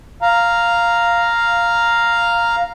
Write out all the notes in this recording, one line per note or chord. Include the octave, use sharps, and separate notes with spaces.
F5 A#5